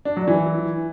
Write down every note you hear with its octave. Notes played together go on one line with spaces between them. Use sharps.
D4
F#3
E3